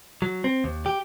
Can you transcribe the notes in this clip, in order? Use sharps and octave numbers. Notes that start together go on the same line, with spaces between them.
F#3
C4
D#2
G4